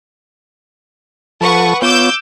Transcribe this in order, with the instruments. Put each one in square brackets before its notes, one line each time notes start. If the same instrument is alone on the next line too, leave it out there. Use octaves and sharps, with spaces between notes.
[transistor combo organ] F3 A4 A5 [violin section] B4 F#5 C#6
[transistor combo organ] B3 F4 C#5 [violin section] D6 E6 G6